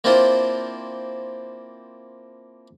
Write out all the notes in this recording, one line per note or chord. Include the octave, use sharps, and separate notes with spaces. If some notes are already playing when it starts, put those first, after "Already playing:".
A#3 C4 D4 E4 F4 C5